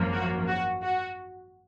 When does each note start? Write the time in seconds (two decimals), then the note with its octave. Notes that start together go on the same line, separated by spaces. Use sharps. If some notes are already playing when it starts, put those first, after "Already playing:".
Already playing: G#1 F#2 F3 A#3
0.13 F#4
0.47 F#4
0.82 F#4